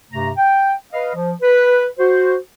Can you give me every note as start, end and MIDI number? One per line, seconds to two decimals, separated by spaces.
0.12 0.31 43
0.12 0.31 48
0.12 0.31 57
0.12 0.31 82
0.38 0.73 79
0.93 1.14 71
0.93 1.14 75
0.93 1.14 77
1.15 1.32 53
1.42 1.85 71
1.99 2.36 66
1.99 2.36 72